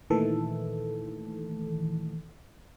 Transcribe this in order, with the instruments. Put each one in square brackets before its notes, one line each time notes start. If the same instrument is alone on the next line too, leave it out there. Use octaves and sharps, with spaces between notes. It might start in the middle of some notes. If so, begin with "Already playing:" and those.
[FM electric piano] A#2 D#3 E3 A3 A4